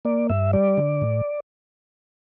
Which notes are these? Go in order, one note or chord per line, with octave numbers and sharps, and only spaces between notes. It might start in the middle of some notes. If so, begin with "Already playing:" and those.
A#3 D5
G2 E5
G3 D5
D3
A2